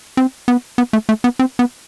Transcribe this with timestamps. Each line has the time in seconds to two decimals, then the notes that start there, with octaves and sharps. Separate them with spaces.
0.17 C4
0.48 B3
0.78 B3
0.93 A3
1.09 A3
1.24 B3
1.39 C4
1.59 B3